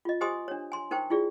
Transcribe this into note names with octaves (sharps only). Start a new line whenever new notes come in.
F4 D#5
G4 C5 D#5 G#5 C6 D#6
D4 C#5
G#5 C6
D#4 A#4 C5 G5 C#6
E4 F4 G#4 D5